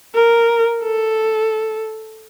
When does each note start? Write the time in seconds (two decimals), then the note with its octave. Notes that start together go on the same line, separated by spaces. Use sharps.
0.15 A#4
0.83 A4